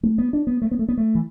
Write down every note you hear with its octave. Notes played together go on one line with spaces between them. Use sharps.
A3
B3
D4
B3
A3
B3
A3
B3
A3
E3